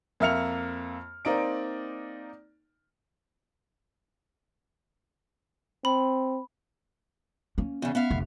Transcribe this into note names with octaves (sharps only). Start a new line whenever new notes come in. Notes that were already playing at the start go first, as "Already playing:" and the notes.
F2 A#3 E5 F6 C#7 F7
A#3 C4 D#4 D5 D7
C4 B5
A#3 C#4
E2 C#3
B3 E5 F5
F1